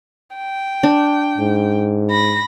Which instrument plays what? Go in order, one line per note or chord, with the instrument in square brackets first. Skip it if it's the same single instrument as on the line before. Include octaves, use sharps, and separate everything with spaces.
[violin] G5
[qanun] D4
[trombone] G#2
[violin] B5 A#6